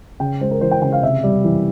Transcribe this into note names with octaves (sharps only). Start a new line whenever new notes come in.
C#3 G5
G#3 C5
A#4
E3 C5
G5
C#3 G5
F5
C3 E5
G3
E3